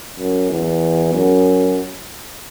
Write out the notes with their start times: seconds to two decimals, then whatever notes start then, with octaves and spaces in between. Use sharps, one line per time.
0.18 F#2
0.50 E2
1.13 F#2